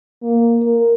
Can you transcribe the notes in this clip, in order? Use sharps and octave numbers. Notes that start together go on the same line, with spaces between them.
A#3
A#4